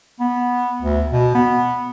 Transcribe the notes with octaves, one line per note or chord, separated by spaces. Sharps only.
B3
D2
B2
B3